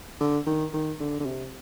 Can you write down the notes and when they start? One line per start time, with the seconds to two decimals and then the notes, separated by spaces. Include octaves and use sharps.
0.20 D3
0.47 D#3
0.73 D#3
1.00 D3
1.20 D3
1.26 C3